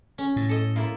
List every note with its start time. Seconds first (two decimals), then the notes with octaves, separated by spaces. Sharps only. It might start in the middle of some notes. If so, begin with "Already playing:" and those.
0.18 C#4
0.36 A2
0.49 A4 D#5
0.76 A#3 E4 F4